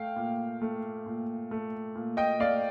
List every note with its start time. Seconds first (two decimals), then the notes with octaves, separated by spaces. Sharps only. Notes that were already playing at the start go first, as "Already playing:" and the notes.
Already playing: A3 F5 G5
0.16 A#2
0.61 A3
1.06 A#2
1.51 A3
1.95 A#2
2.17 D#5 G5
2.39 A3 D5 F5